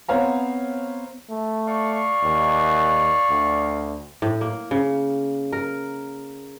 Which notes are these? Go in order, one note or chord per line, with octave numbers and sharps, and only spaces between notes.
B3 C4 C#5 F5 A#5
A3
D5 F5 C#6
D#2
D2
A2
A#3
C#3
A#4